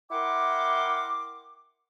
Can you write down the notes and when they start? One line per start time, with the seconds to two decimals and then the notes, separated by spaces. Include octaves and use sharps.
0.11 E4 A#4 F#5 G5 C6 D6